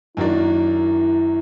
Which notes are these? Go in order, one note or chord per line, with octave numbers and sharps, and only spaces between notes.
F#2 D#3 F#3 A#3 D4 E4